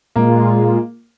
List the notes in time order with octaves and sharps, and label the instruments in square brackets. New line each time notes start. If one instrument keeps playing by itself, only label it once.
[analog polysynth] A#2 G#3 F4 [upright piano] A#3